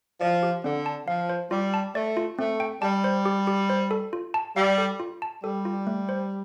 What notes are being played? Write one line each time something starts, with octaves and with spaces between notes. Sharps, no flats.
F3 D5
G4
D3 C4
A5
F3 F5
C5
G3 F4
A5
A3 D5
F4
A3 C4
G5
G3 A5
C5
G4
G4
C5
A4
F4
A5
G3 F5
A4
F4
A5
G3 A4
F4
A3
C5